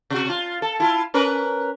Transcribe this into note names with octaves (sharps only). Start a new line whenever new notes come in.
C3 F#4
F4
A4
E4 F4
C#4 A#4 B4